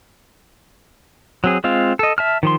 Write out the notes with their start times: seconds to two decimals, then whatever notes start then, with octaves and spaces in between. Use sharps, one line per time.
1.44 F#3 C4 G#4
1.64 G#3 C4 F4 F5
1.99 A4 D#5
2.18 E5 A5 F6
2.43 D#3 F3 C6